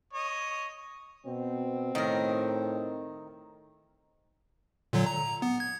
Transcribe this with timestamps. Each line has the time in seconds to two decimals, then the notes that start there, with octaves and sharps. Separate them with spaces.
0.13 C#5 D#5
1.26 B2 C4
1.95 A2 D#3 A#4
4.93 A#2 D3 F#3
5.06 A#5
5.42 B3
5.60 G#6